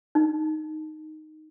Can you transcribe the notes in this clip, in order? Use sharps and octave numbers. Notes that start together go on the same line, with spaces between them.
D#4